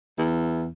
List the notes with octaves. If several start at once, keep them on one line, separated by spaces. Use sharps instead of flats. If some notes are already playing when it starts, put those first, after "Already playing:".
E2